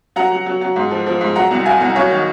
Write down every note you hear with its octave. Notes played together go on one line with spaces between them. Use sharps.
F#3 F#5 A#5
F#3
F#3
F#3
G#2
F3
F3
G#2
F#3 F#5 A#5
C2
F#3 F5 G#5
C2
F#3 C#5 F5
D#3